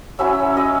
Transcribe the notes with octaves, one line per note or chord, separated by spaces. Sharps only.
F#3 C#4 E4 E5 E6
D#5 D#6